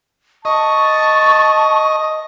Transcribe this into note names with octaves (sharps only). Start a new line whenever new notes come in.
D#5 A5 C#6